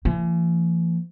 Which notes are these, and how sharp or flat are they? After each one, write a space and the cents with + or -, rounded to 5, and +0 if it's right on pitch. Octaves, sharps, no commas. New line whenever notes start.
E3 +45 A#3 -45